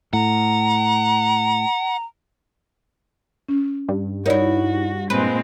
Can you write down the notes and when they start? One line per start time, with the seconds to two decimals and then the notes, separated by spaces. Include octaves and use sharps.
0.13 A2 F#5 A#5
3.49 C#4
3.89 G2
4.26 D#4 E4 F#4 A#4 C#5 D5
5.10 A#2 G#3 C4 B4